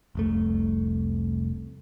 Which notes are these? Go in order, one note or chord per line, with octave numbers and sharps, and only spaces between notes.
F1 C2 A3